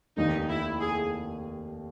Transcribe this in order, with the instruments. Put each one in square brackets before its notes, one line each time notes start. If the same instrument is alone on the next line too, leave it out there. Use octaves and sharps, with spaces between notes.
[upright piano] F1 D#2 D#3 [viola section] D#4
[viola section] E4
G#4